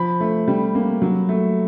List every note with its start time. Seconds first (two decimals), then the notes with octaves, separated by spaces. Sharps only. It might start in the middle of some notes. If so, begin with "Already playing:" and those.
Already playing: F3 B5
0.20 A3
0.48 G3
0.75 A#3
1.02 F#3
1.29 A3